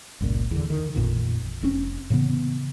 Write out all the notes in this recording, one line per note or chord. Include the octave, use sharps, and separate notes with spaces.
G1 C#2 A#2
E2 D3
D#3
A1 F2 A#2 D#3
F1 C4 C#4
A2 C#3 E3 B3